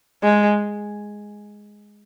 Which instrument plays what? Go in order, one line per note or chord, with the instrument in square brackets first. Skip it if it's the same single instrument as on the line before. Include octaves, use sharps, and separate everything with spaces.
[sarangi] G#3